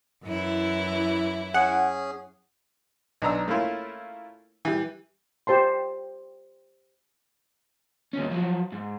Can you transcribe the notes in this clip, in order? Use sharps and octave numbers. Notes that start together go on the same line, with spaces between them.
F#2 E3 E4
C#4 G#4 F#5
B1 D4 A#5 E6
A3 A#3 C#4 E4 F4
E3 G3
G4 C5 A5 C6
D#2 C#4
F3 F#3
G#2